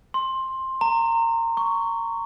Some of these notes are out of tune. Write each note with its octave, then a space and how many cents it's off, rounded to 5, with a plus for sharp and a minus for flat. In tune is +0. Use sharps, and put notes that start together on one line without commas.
C6 +10
A#5 -20
C#6 +10